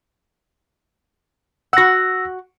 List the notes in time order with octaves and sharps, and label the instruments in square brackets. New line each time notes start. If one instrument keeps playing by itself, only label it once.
[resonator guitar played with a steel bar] F#4 F#5 [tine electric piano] E6 A#6